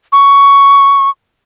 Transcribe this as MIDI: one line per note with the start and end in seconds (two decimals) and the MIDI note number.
0.12 1.10 85